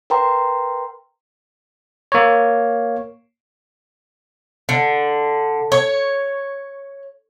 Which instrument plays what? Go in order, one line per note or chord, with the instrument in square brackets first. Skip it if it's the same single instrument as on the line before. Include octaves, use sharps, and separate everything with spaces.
[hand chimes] A#4 B4 G5 A#5 C6
[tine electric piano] A#3 C#5
[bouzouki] D3
C#5